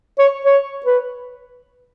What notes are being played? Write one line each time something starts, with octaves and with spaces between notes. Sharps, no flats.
C#5
C#5
B4